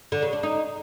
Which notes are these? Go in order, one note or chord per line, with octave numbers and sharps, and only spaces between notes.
D3
C#3
D4
D#4